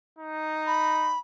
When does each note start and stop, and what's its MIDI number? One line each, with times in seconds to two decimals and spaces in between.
0.19 1.15 63
0.67 1.19 83